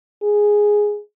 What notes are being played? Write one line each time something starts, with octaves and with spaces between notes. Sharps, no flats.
G#4